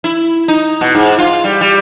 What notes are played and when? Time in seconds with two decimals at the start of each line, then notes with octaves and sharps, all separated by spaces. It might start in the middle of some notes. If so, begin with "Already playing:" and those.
0.04 E4
0.48 D#4
0.81 B2
0.95 G#2
1.18 F4
1.44 G3
1.61 G3